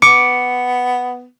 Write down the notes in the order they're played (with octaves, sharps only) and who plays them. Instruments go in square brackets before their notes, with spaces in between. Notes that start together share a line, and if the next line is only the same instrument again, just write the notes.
[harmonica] B3 [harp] D6 [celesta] C#7